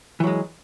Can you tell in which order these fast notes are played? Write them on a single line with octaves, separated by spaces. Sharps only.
E3 F#3 G#3